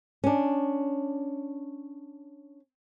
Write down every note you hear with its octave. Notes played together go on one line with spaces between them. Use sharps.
C#4 D4